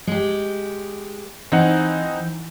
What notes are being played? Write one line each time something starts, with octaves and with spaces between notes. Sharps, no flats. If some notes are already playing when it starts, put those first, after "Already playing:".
G#3 G4
E3 C4 D#4 F#5